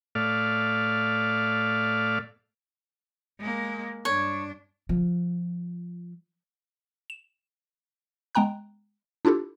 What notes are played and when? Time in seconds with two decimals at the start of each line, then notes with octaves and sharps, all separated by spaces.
0.15 A2 A3 D5 F5 F6
3.40 G#3 A#3
4.05 G2 D4 C#5
4.89 F3
7.10 E7
8.35 G#3 B3 G5 A#5 F#6
9.25 D4 E4 F4 G4 A4